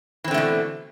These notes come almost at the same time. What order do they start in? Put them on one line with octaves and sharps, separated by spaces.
E3 C4 D3 A3 B2